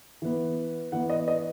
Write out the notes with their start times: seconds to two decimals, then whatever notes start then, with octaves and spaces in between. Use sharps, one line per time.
0.22 E3 B3
0.92 E3 B3 F#5
1.10 D#5
1.28 D#5